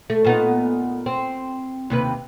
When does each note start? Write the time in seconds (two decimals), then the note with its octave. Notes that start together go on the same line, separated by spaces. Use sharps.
0.10 A3
0.25 A#2 B3 D#4
1.06 C4
1.90 D#2 C3 B4